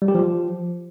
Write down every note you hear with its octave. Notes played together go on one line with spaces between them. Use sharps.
G3
G4
F3